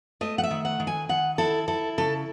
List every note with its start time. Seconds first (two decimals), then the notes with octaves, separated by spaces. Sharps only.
0.21 A3 D#5
0.38 F#5
0.43 E5
0.50 D#3
0.65 F#5
0.80 D#3
0.87 G#5
1.09 D#3 F#5
1.38 E4 A4
1.68 E4 A4
1.98 C#3 A4